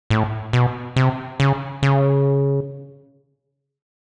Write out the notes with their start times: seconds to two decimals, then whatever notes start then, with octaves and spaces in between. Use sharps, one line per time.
0.10 A2
0.53 B2
0.96 C3
1.40 C#3
1.83 C#3